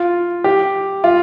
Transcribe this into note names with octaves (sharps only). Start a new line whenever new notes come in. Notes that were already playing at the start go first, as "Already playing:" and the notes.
Already playing: F4
G4
F4